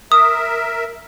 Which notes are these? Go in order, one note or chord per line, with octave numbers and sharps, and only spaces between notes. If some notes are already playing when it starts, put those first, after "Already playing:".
A#4 E5 D#6